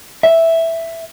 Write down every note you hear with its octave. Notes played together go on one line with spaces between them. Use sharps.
E5